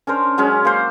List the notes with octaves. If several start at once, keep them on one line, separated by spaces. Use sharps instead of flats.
C#4 D4 A#4 C5
F#3 G#3 C#4
A#3 C5